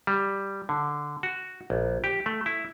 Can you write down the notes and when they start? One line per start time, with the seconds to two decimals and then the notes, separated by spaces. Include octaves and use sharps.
0.07 G3
0.69 D3
1.23 F#4
1.70 A#1
2.04 G4
2.26 A3
2.46 E4